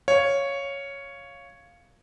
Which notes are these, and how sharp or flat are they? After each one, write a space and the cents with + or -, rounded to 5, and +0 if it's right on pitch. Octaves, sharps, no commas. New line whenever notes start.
C#5 +0 F5 +0